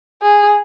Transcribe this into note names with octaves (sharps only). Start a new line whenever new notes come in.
G#4